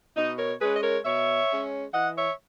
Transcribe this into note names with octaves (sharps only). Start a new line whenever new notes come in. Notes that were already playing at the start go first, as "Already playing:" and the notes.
B2 D#4
A#4 C#5
G#3 C#4 G#4 B4
D#5
A#4 C#5
B2 C#5 E5
G#3 C#4
E3 D#5 F#5
C#5 E5